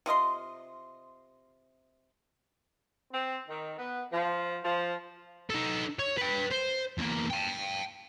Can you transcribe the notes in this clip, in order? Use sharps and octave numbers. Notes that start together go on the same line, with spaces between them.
C3 F4 D#5 C6
C4
D#3
B3
F3
F3
D#4 A4
C#5
B4 G5
C5
E2 A#3
G5 A5